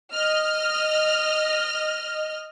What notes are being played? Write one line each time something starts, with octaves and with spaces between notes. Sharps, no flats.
D#5 F6